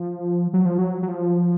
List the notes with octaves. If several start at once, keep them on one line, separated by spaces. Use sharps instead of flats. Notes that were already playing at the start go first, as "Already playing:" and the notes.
Already playing: F3
F#3
F3
F#3
F#3
F3